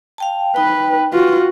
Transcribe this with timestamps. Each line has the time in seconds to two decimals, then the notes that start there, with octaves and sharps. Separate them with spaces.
0.18 F5 G5 A5
0.56 D#4 B4 G5
1.13 F4 F#4 B4